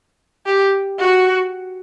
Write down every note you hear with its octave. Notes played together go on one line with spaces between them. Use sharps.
G4
F#4